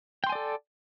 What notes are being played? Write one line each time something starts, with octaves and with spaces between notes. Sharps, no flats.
A4 D5 G5 G#5 C6